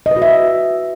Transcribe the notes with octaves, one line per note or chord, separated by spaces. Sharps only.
D#5
B4
F#4
E5